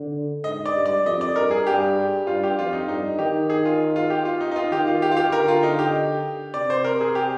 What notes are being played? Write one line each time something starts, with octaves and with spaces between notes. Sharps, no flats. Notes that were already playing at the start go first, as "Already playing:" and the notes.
Already playing: D3
G#2 D#5
D5
G2
D5
F2 D#5
D5
G2 A#4
G#4
G2 G4
G2 F4
G4
F2 F4
D#4
G2 D#4
D#3 G4
G#4
F4
F4
G4
F4
D#4
D#4
F4
D#3 G4
F4
G4
F4
G4
D3 A#4
F4
D#4
G4
C3 D5
C5
A#4
G#4
G4